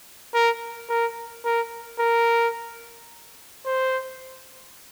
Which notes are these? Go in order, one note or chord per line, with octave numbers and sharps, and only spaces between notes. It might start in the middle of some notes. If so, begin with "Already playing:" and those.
A#4
A#4
A#4
A#4
C5